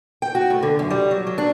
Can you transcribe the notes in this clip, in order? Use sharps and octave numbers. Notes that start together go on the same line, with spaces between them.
G5
F#4
A2
D3
F#2
G3
F#3
F#3
D4